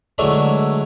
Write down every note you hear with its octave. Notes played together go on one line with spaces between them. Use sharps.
D3 E3 F#3 G#3 A3 D4